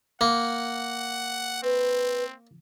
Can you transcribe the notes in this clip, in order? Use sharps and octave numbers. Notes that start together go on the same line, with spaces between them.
A#3 F#5
C4 B4